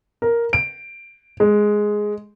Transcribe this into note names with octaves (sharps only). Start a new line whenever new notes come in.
A#4
D7
G#3